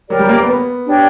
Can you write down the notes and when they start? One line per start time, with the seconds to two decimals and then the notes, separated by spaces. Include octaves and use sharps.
0.09 F#3 G4 A#4 D5
0.19 G3
0.29 A#3
0.39 B3
0.49 B3
0.86 D4 G4 C#5 G5